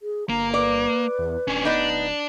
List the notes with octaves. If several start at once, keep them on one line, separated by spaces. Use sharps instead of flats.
G#4
G1 A#3 A#5
B4 D5
E2
D1 C#4 D4
B3 D4 D#4 D5